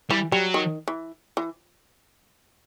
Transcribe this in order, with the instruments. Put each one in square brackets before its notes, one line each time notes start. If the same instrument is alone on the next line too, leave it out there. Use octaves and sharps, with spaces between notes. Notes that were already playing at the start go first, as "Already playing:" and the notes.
[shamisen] E3 [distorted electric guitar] G3
[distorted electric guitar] F#3 [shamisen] G3
[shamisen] D#3
E3
E3